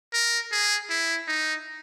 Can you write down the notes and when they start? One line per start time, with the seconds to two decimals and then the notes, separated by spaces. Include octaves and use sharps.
0.13 A#4
0.52 G#4
0.90 E4
1.28 D#4